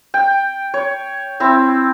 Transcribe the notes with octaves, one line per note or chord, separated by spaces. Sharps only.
G5
C#5
C4 E4